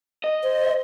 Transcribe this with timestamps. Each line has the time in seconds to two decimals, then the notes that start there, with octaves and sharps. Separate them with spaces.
0.24 D#5
0.43 C5